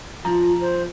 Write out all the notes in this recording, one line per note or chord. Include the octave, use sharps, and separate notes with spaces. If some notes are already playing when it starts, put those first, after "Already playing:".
F3 F4 A#5
C5